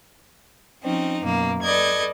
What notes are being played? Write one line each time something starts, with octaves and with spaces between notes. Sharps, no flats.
F3 C4 C#4 D#4
F#2 B2 A#3
A4 B4 D5 D#5 G#6